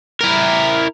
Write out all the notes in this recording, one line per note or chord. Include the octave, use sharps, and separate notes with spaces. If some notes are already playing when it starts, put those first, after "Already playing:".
E4 A#4